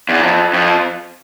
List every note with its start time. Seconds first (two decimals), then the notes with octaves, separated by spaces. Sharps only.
0.09 E2
0.23 F2
0.54 F2